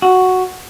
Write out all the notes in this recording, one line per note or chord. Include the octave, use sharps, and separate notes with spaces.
F#4